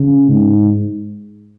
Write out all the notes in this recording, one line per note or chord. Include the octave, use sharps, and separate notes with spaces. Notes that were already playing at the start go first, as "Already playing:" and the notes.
Already playing: C#3
G#2